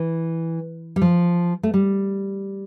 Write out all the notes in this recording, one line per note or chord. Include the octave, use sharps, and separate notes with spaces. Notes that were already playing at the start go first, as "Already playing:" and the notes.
Already playing: E3
G3
F3
A3
G3